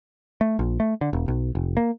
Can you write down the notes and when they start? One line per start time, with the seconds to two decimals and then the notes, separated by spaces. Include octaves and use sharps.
0.41 A3
0.59 A#1
0.80 A3
1.01 D3
1.13 E1
1.28 B1
1.55 F1
1.77 A#3